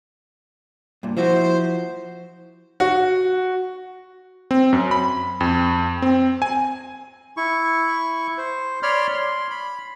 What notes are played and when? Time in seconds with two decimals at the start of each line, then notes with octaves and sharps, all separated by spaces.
1.03 G2 A#2
1.17 F3 E4 F#4 C5
2.80 F#4
4.51 C4
4.73 F#2
4.91 B5
5.41 F2
6.02 C4
6.42 G#5
7.37 E4 C#6
8.38 C5
8.83 C#5 D5 B5 C6 F6
9.14 C6
9.50 B5